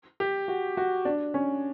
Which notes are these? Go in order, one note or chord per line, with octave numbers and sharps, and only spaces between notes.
G4
F#4
F#4
D4
C#4